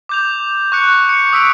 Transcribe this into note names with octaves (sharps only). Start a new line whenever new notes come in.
D6 G6 F7
C#6 F#6 C#7
C#7
D#6 E6 B6 D7